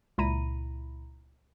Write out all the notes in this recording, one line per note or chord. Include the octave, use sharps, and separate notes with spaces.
C#2 A#2 E4 A#5 B5 D#7